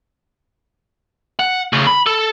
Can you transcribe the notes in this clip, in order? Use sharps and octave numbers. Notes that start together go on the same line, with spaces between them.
F#5
C#3 A3
B5
A4